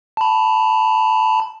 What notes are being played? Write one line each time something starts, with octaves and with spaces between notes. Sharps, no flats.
A5 B5